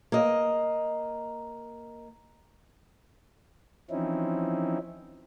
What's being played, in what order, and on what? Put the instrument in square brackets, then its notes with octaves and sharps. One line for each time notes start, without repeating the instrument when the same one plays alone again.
[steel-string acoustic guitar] A#3 D#5
[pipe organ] E3 F3 C4 C#4 D#4 E4